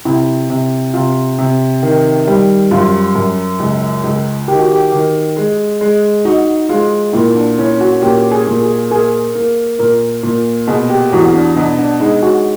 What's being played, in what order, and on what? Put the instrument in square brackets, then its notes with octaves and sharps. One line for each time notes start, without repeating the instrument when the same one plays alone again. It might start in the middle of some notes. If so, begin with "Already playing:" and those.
[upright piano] C3 [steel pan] E4
[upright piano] C3
[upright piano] C3 [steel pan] F4
[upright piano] C3
D#3
G3
[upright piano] F#2 [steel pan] F4
[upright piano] F#2
C#2
C#2
[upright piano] D#3 [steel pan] G4
[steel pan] F#4
G4
[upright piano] D#3
G#3
G#3
[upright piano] D#4 [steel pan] F#4
[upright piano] G#3 [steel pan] F4
[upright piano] A#2 [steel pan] E4
[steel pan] D4
[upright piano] C#4 [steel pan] E4
[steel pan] F#4
[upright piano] A#2 [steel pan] G4
[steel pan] G#4
[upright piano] A#2
[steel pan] G#4
[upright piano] A#3 [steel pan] G#4
[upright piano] A#3
[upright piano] A#2 [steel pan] A#4
[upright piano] A#2
[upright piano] B2 [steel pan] G#4
[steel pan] G4
[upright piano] E2 [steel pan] F#4
[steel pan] D4
[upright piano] B2 [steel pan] D4
[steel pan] D4
[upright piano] G#3 [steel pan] D#4
[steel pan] F#4